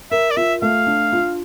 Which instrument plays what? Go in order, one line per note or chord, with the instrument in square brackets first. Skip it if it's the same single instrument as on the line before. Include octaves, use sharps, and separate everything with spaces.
[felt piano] A#4 [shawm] E5
[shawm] D5
[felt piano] F4 [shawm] E5
[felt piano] A3 [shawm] F5
[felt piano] D4
F4